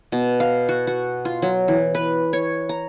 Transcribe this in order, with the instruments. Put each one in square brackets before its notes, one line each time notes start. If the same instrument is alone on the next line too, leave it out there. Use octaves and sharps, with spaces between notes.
[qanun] B2
F5
F#4
F#4
F4
F#3
E3
B4
C#5
A#5